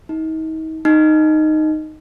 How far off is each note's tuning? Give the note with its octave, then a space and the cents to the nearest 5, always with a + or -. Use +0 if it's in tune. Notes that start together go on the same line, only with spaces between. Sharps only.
D#4 +40
D#4 -5